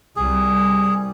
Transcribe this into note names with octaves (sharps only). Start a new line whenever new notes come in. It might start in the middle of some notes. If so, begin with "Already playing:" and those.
C2 G3 G#4